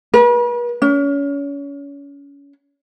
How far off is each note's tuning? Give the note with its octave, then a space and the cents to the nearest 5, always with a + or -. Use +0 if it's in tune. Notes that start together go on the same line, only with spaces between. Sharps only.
B4 -40
C#4 +30